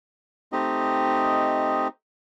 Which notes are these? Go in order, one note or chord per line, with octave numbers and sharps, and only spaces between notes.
A3 C4 D#4 G4 D#5